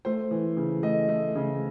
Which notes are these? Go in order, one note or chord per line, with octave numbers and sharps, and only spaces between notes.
A3 C5
E3
C#3
A3 D#5
A3
C#3